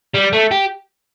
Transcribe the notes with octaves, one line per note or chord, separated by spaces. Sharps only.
G3
A3
G4